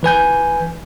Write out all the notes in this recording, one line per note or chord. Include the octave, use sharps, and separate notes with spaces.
E3 B4 G#5 G6